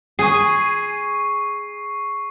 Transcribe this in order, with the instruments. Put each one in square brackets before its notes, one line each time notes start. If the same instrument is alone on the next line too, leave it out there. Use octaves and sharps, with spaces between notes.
[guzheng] G#4 G#5 [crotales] C#6 C7